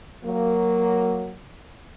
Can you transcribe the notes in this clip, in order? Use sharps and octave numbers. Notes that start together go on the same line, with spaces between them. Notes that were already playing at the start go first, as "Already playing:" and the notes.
F#3 A#3